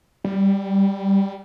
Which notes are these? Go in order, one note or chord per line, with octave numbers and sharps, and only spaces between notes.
G3